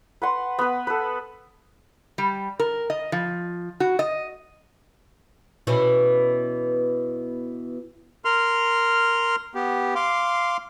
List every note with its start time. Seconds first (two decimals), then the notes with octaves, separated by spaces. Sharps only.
0.22 B4 F#5 C6
0.59 B3 B4
0.87 A4 B4
2.18 G3
2.59 A#4
2.90 D#5
3.12 F3
3.80 F#4
3.99 D#5
5.67 B2 E3 C#4
8.25 A#4 C6 F6
9.55 B3 G4
9.95 F5 C6 D6